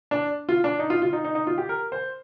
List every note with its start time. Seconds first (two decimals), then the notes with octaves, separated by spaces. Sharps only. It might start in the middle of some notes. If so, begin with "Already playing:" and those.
0.11 D4
0.49 F4
0.64 D4
0.79 D#4
0.90 F4
1.02 F4
1.13 D#4
1.25 D#4
1.35 D#4
1.47 F4
1.58 G4
1.69 A#4
1.92 C5